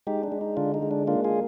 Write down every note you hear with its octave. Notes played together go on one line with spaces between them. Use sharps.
G#3 D#4 G4
D4
G#3
D#4
D3 D4 F4
D#4
G#3
D4
A#3 D4 F4
F4 G#4